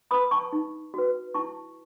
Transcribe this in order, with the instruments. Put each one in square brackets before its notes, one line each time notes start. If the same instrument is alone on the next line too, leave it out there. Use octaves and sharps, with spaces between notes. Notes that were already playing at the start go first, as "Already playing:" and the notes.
[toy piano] B4 B5 D#6
A5 C#6
D#4
F#4 B4
E4 A5 C#6